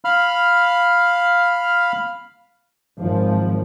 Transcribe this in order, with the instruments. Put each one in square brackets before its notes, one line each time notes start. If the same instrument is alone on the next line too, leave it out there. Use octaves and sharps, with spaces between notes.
[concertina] F5 B5 F6
[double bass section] G#1 F3